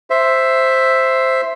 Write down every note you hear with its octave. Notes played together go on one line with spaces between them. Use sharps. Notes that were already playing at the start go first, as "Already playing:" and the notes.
C5 E5